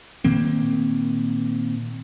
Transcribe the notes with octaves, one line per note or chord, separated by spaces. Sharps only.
A#2 D#3 A#3 C4